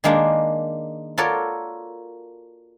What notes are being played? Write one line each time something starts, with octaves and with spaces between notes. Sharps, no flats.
D#3 G#3 A#3 D4
F4 F#4 A4 A#4 C#5 D5